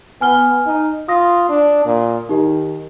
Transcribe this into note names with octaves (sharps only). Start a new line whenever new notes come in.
B3 G#5 F6 G7
D#4
F4 D#6 A#6
D4
A#2
D#3 D#4 G4